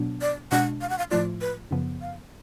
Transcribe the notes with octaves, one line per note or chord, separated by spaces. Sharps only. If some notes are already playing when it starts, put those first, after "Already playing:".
Already playing: B2 F#3 B3 D4
D5
B2 G#3 D4 F#5
F5
F#5
F5
A2 F3 A3 F4 D5
B4
F#2 C#3 F3 B3
F5